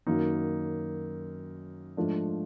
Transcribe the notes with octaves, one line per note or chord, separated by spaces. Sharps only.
F#2 D#3 F#3 A#3 D#4
G#2 F3 A3 D4